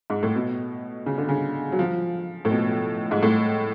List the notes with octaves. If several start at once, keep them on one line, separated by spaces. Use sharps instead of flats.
G#2
A2
B2
C#3
D3
C#3
F#3
F3
A2
B2
G#2
A2